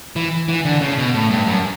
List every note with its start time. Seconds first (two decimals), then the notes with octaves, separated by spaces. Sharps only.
0.16 E3
0.48 E3
0.65 D3
0.81 C#3
0.98 B2
1.14 A2
1.30 G2
1.46 F#2